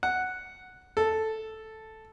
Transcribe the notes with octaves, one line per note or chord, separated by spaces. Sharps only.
F#5
A4